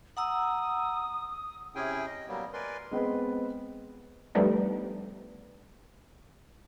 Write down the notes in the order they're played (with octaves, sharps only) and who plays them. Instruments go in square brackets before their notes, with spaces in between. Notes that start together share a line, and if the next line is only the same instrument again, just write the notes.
[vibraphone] F#5 A#5 E6 [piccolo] D#6
[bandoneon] C3 C#4 E4 G#4 G5 G#5
D#5
F#3 G3 A#3 B3
A#4 B4 D5 G#5 C6
[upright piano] G#3 B3 C4 B4
[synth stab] F3 G3 A3 B3 D4 D#4